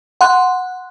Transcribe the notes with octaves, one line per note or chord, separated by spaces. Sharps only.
F#5 C6 F#6